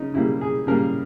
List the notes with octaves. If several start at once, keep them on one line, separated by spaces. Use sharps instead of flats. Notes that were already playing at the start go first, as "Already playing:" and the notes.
Already playing: C#3 D#4
C#3 G3 A#3 E4
G#4
C#3 G3 A#3 A#4